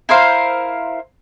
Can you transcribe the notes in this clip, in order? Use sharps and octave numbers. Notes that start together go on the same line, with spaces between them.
E4 A#4 C5 F5